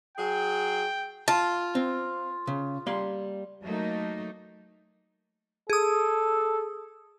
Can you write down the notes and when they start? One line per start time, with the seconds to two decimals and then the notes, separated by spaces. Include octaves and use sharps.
0.17 F#3 G#4 G5
1.28 F4 A5
1.75 C4
2.47 C#3
2.86 G3 A#3 C6
3.63 F#3 A3 A#3 D#4
5.70 G#4 A4 D#6